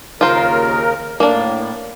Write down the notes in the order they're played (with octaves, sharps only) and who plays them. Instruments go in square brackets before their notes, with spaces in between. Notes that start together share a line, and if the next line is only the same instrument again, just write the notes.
[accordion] D#2 C#3 A#4 [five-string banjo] F4 C5
[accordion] A2 [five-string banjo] A#3 D4